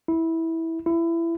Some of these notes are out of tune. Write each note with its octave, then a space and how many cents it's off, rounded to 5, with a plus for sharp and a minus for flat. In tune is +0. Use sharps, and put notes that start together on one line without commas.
E4 -15
E4 +20